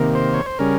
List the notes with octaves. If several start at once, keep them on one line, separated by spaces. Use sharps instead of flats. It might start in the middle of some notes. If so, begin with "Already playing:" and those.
Already playing: C3 D#3 A#3
C5
C#5
C5
C#3 G3 C#4 A#4